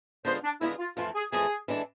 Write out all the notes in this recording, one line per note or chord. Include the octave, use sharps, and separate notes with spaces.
D3 G#3 B3 F4 G#4 C5
D4
D3 G#3 B3 E4 F4 G#4
F4
F2 E3 A3 F4
G#4
F2 E3 A3 G#4
E3 G#3 D4 A4